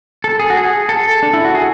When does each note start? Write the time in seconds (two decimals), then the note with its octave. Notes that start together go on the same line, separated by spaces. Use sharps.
0.24 A4
0.39 G#4
0.50 F#4
0.57 G#4
0.89 A4
1.23 D4
1.34 E4
1.45 F#4
1.55 G#4